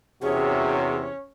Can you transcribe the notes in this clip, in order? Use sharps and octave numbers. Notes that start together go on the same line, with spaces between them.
E2 C3 C#4 F#4 G#4 C#5